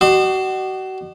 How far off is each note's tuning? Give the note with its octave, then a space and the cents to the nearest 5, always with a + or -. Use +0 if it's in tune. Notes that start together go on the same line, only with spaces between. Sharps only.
F#4 +35 D#5 -45 C6 -5